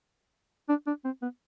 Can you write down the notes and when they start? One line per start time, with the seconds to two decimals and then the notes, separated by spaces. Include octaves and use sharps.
0.69 D4
0.87 D4
1.05 C4
1.22 B3